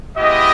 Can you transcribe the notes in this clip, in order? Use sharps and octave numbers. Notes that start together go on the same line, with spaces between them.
G#3 B3 E4 G4 D#5